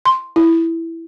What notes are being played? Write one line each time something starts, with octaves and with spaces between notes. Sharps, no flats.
C6
E4